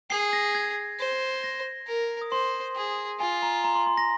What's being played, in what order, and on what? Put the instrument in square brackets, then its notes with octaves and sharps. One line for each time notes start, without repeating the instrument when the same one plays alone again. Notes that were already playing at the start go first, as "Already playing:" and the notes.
[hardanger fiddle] G#4 [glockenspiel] C7
[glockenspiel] A#6
G#6
[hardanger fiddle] C5
[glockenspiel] A#6
[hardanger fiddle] A#4
[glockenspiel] D#6
[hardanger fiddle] C5 [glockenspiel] C6
[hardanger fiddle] G#4
[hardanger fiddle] F4 [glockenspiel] G#5
[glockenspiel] A#5
A#5
C6
C6
A#6